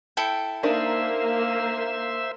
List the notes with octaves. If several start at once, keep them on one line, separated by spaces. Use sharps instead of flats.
E4 A4 G5
A#3 D4 D#4 A#4 C5 E5